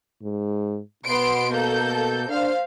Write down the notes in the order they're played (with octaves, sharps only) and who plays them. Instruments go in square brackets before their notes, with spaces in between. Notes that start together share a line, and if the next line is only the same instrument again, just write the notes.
[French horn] G#2
[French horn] B2 [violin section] B3 C6 D7
[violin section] A#3 A4 G6
[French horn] D4 [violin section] C5 F5